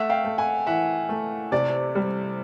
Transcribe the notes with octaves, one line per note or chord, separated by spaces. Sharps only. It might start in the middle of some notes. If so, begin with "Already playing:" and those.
Already playing: A3 E5 F#5
F5 G5
A3
F#5 G#5
E3 E5 F#5
A3
C3 D5
G3